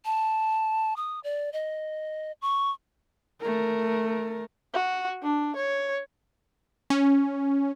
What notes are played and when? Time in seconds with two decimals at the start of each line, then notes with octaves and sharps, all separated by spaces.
0.05 A5
0.97 D#6
1.24 D5
1.53 D#5
2.42 C#6
3.41 A3 A#4
4.74 F#4
5.23 D4
5.56 C#5
6.90 C#4